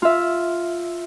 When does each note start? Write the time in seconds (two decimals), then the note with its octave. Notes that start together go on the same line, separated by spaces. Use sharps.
0.02 F4 E5